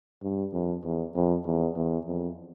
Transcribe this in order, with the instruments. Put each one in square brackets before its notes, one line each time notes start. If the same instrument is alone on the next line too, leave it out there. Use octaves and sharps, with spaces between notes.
[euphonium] G2
F2
E2
F2
E2
E2
F2